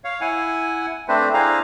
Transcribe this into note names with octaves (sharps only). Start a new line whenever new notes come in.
C#5 F5
E4 F#5 G#5
A3 C4 D4 B4 C5
D4 E4 G#4 C5 F5 A#5